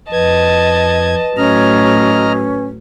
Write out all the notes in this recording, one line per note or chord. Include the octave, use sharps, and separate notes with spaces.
F2 B4 D#5 A5 G#6
A2 F#3 C#4 D#5 A#5 F6